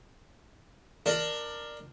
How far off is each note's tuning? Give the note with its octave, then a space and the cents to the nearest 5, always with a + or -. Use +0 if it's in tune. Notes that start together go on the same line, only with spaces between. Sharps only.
D4 +20 A#4 +0